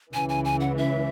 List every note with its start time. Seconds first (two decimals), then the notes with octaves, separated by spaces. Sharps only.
0.13 C#2 C#3 E3 G#5
0.29 G#5
0.45 G#5
0.61 F#5
0.78 E5